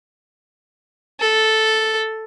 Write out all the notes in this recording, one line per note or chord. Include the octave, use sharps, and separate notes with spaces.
A4